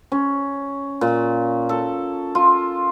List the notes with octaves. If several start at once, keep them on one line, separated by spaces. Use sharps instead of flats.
C#4
A#2
A4
F4